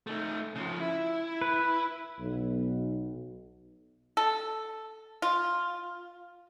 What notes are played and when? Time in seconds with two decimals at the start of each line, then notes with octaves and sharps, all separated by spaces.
0.07 A3 D#4
0.55 C#3 F3
0.79 E4
1.41 B4
2.19 B1
4.17 A4
5.22 F4